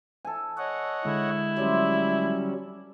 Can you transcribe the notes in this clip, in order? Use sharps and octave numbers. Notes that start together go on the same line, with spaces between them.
A4 G#5
C#5 D#5 F#5
D3 G#3 E4
F#3 G3 C#4 D5 E5 C6